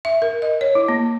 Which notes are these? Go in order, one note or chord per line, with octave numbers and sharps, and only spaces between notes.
E5
A#4
D#5
C#5
E4
A#3